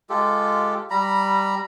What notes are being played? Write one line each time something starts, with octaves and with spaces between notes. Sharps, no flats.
G#3 F4 G4 A4
G3 A#5 B5